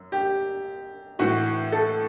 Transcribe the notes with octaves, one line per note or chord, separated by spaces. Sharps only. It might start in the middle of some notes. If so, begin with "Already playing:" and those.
Already playing: F#2
G4
A2 E3 F#4
A4